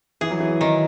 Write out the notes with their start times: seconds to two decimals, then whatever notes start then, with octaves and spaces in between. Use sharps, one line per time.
0.21 E3 G#4
0.31 F#3
0.40 E3
0.61 D#3